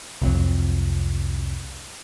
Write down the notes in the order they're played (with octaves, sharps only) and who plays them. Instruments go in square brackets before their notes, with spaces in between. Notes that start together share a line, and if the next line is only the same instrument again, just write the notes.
[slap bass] C2 F2 F#3